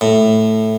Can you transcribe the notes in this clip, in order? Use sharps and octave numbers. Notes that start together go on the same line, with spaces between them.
A2